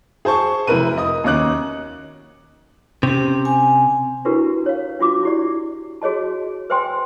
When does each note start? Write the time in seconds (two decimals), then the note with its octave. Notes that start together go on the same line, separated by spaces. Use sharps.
0.25 G#4 C5 A5 C#6
0.67 F1 C3 E4 A#4 B4 D#7
0.98 D#5 D#6
1.24 D#2 C#4 D#5 D6 F#6 F#7
3.03 C3 C#4 G4
3.45 G#5
4.25 D4 E4 F#4 G4 A#4 B4
4.66 C#5 F5
4.99 D4 F4 F#4 D6
5.23 E4 G4 D5
6.02 F#4 G#4 C#5 D#5 A5
6.70 B4 C5 E5 G5 G#5 C6